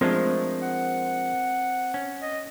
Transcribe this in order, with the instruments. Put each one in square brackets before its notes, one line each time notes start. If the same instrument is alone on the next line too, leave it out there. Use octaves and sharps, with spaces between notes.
[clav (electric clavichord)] F3 G#3 D4 [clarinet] A3 [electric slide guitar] C4 A#4 C5
[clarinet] F#5
[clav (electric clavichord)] C#4
[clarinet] D#5